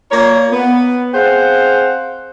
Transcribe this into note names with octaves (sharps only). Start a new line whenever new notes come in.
A#3 F4 C#5 D5 A#5
B3
C4 G#4 C5 F5 F#5